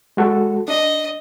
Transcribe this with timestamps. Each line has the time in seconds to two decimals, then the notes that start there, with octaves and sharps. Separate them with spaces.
0.17 G#3 F#4 A4
0.68 D4 D#5